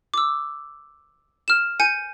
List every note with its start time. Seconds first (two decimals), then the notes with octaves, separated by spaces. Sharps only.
0.14 D6 E6
1.48 F6 E7
1.80 G#5 G6 C#7 D#7